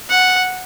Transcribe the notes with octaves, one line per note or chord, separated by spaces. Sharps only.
F#5